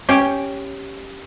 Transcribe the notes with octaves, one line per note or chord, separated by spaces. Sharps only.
C#4 G4